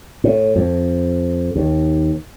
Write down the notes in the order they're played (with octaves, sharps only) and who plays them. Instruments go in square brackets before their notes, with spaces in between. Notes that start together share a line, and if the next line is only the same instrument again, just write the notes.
[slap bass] A2
F2
D#2